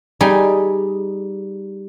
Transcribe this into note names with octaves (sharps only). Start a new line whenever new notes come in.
G3 D#4 G#4